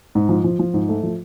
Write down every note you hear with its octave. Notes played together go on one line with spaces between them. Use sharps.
G#2
F3
F3
F3
G#2
A3
F3